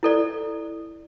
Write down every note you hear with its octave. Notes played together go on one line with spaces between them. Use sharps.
E4 A4 D5